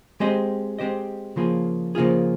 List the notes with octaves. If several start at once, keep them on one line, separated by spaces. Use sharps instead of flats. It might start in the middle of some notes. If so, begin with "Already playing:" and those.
G#3 C4 G4 C5 D#5
G#3 C4 G4 C5 D#5
C#3 F3 A#3 F4 G#4
C#3 F3 A#3 F4 G#4